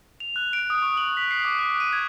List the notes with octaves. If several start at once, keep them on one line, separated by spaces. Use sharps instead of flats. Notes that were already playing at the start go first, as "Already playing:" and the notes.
F7
F#6
D7
D#6
C#6
F#7
B6
C7
D6
F#6
D#7
G#6